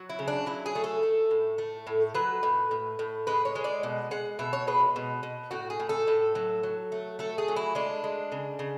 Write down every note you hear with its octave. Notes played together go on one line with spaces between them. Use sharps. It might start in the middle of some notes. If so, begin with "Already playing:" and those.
Already playing: F#3
E4
C#3
D4
F#3 E4
G#4
A3
A4
A3
A2
A3
A2
F#3 B4
A2
A2
A2
G#3 B4
C#5
G#3
D5
B2
G#3 F#5
B2 E5
C#5
G#3 B4
B2
B2
A2 F#4
G#4
A2
A4
A2
F#3
F#3
A3
A3 A4
G#4
F#3
E4
G#3 D4
G#3
C#3
C#3